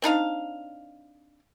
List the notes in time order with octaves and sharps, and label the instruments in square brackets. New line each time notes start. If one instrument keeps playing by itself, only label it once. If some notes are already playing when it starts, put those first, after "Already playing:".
[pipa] C4 D4 D#4 F5